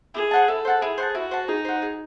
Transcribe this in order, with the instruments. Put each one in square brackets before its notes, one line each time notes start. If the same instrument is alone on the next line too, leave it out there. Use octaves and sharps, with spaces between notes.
[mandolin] E4 [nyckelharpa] G#4
[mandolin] C5 F#5 A5
[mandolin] E4 [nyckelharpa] A4
[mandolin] C5 F#5 A5
[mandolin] E4 [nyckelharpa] G#4
[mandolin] C5 F#5 A5
[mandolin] E4 [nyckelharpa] F#4
[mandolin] C5 F#5 A5
[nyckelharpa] D#4 [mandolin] G#4
[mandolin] C5 F#5
G#4